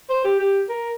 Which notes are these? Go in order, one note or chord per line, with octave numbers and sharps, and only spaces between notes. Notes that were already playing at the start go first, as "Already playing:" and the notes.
C5
G4
G4
A#4